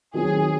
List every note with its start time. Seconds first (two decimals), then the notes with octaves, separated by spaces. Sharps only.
0.14 D#3 F#3 C4 G#4